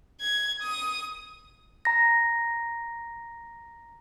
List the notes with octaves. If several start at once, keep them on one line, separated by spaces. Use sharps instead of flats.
G#6
D#6
A#5 A#6